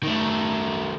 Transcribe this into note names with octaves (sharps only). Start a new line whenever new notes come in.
D#3 A3